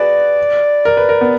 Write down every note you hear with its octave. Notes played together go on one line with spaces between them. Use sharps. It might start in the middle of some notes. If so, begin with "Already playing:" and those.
Already playing: F#4 G#4 B4 D5
A#4
B4
A#4
B3